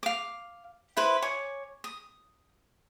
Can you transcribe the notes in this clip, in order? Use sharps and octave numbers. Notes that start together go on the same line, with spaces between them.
F5 D6
E4 B4 C5
C#5 G#5 D6
D#6